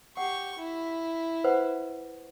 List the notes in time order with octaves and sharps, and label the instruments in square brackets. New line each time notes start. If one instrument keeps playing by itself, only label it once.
[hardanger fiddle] G4 C#6 [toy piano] F#5
[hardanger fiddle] E4
[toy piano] B4 C5 F#5